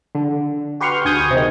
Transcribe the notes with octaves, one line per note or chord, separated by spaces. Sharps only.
D3
F#4 G4 B4 C6 C#6 F6
D2 G#4 G#5 C#6 D#6 G6
C3 D#3